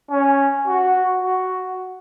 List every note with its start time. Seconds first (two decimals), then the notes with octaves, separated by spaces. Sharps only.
0.10 C#4
0.67 F#4
1.22 F#4